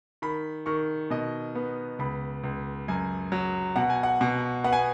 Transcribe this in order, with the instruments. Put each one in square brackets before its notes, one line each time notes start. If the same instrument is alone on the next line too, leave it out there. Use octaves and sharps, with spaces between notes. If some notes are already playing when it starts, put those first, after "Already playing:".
[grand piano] D#3 B5
D#3 C#6
B2 D#5
B3
C#2 B5
C#2
F#2 G#5
F#3
B2 F#5
G#5
F#5
B2
B3 F#5
G#5